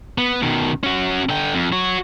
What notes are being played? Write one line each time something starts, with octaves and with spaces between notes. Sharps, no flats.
B3
B2 D#3
C#4 F#4
D3 G5
F2
F#4 C#5